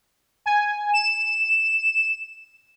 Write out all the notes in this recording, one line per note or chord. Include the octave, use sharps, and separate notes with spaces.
G#5
E7